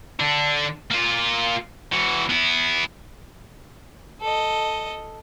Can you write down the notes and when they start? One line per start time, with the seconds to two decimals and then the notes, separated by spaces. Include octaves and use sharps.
0.20 D3 D4
0.91 A#3 F4
1.92 E3 F#4
2.29 B3 E4
4.21 A4 D#5